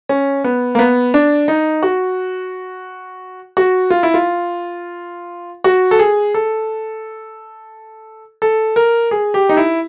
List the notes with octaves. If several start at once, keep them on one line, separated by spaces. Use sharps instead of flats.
C#4
B3
A#3
B3
D4
D#4
F#4
F#4
F4
E4
F4
F#4
A4
G#4
A4
A4
A#4
G#4
G4
D#4
E4